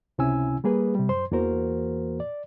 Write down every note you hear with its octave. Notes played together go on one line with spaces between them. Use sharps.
C#2 C3 C#4 E4 G#5 E6
G3 A#3 G#4 B4
C3 G3
F#2 C5 C6
E2 E3 A#3 F#4 A#4 C5
D5